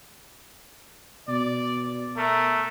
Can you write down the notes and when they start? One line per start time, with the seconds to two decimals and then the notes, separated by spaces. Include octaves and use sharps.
1.28 B2 D5
2.17 A3 A#4